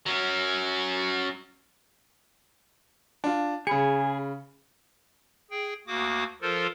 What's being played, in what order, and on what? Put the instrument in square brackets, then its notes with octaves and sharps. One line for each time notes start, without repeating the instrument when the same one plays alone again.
[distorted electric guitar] F#3 C#4
[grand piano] D4 F4
[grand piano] C#3 B5 C#7 [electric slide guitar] G#4
[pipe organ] G#4 G5
D2 A#3 F#4 D6 D#6
F3 F4 A4 A#4 C5